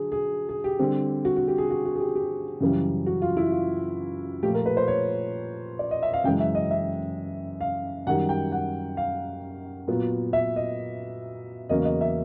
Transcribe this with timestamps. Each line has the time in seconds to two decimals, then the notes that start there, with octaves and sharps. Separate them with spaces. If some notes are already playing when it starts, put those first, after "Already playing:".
Already playing: D3 F#3 G#4
0.12 G#4
0.49 G#4
0.64 G4
0.79 D3 G3 C4
1.25 F#4
1.37 F#4
1.48 G4
1.58 G#4
1.70 F#4
1.85 F#4
1.96 G#4
2.00 G4
2.15 G4
2.61 F#2 C#3 E3 G3
3.06 F#4
3.22 F4
3.37 E4
3.52 F4
4.43 A#2 F3 A3 G4
4.54 A#4
4.66 B4
4.77 C5
4.88 C#5
5.79 D5
5.91 D#5
6.03 E5
6.14 F5
6.24 F#2 C#3 E3 G#3 G5
6.40 E5
6.55 D#5
6.71 E5
7.61 F5
8.07 F#2 D#3 G3 F#5
8.29 G5
8.52 F#5
8.97 F5
9.88 A#2 F#3 B3
10.33 E5
10.56 D#5
11.69 E2 C#3 F#3 A#3 C#4 D#5
11.85 D#5
12.01 E5